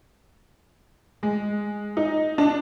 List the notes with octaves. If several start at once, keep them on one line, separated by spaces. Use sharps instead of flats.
G#3
D#4
D4